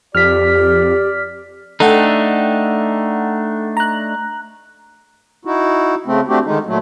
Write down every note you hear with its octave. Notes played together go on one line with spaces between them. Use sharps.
F2 G4 D5 F6 B6
A3 D4 D#4 A4 F#5 G5
A#5 F#6
D#4 E4 F#4
C#3 A3 C4
A3 C4 D4 F#4 G4
D3 D#3 G#3 D#4
A#2 F#3 A3